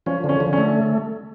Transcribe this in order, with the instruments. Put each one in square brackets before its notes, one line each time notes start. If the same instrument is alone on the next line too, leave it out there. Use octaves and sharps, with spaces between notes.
[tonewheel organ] F3 [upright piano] C#4
[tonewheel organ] D3 [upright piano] C#4
[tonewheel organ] D3
[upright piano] C#4
[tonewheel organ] A3